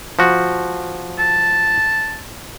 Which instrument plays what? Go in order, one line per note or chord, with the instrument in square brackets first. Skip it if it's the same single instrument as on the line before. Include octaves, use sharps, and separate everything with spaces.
[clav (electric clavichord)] F3 F#4
[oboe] A5